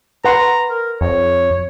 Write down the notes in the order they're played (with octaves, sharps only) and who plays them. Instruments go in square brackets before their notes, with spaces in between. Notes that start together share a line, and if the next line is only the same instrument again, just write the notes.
[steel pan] B4 F#5 C6 [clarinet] A#5
[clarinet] A#4
[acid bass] F2 [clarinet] C#5